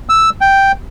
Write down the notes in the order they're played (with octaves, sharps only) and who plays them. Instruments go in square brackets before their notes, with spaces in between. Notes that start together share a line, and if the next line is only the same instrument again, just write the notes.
[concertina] E6
G5